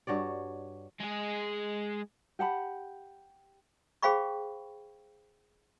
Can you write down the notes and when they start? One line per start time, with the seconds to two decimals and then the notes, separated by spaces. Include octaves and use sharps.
0.07 G2 F#4 C#5 D5
1.00 G#3 G#4
2.39 G4 F#5 A5 B5
4.02 G#4 C5 F5 G5 B5 C#6